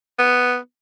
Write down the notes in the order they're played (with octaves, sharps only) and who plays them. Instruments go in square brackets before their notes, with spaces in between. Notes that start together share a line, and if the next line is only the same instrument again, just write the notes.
[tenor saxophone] B3